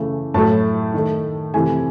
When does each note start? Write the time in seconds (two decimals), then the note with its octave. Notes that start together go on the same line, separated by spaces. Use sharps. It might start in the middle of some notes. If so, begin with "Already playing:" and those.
Already playing: C#3 E3 A3
0.34 A2 F#3 A3 A5
0.94 D#3 A3
1.54 C3 E3 A3 G#5